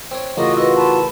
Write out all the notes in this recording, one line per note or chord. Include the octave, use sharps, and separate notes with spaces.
C4 C#5
A1 C#3 A#3 F4 F#4 D#5 C6 D#6
E4 B4 D#5 C#6
A5 B5 C6